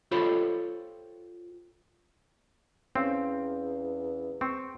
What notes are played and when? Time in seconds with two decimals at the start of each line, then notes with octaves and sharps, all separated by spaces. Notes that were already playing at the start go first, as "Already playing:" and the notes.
0.11 F4 G4 A4 C5 C#5 B5
2.96 E2 C4 C#4 F5
4.41 C4 C#6